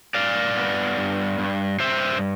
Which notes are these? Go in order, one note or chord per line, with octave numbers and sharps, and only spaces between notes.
G2 D5 F5
B3
G2
G2
G2 C5 E5